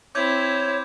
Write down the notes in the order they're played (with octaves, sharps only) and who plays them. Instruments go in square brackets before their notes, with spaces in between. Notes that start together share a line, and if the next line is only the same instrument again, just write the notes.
[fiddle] C4 E4 [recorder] C#5 [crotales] D6 G6 G#6